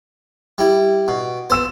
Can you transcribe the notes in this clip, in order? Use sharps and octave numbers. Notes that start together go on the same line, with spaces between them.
G3 E4
B2
B3 C5 E6 E7